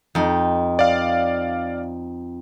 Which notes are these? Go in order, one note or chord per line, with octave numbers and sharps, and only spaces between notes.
F2 D#4
D5 F5